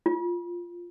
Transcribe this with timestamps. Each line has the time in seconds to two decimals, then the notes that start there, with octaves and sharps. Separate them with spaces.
0.06 F4